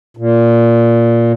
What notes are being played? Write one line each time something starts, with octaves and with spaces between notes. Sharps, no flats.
A#2